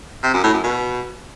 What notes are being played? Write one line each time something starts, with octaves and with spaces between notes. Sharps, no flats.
C3
F#2
A2
F#2
B2